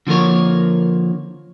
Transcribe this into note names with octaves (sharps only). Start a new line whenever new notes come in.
D3 F3 A#3 A#4 C#5